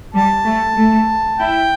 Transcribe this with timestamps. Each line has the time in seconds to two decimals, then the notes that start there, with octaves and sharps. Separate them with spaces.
0.14 G3 A5
0.45 A3
0.76 A3
1.39 E4 G5